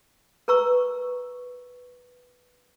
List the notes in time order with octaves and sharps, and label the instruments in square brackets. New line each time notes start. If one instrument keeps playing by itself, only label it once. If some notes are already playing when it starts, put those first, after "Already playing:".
[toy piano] A#4 B4 A#5 C#6 E6